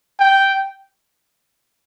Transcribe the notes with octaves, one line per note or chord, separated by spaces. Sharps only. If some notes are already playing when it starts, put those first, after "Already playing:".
G5